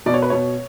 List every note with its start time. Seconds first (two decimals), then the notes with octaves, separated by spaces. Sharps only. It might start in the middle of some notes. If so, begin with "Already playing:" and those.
0.06 B2 D5
0.14 C#5
0.22 B4
0.30 B2 C#5